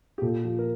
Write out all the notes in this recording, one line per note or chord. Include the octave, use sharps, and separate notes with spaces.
G4
A#2 A4
F3
A#4